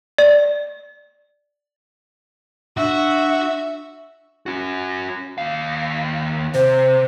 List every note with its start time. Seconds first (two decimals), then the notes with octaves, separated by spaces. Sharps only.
0.18 D5
2.77 D4 F#4 E5
4.46 C#4 F#4
5.38 D#2 F5
6.54 C3 C5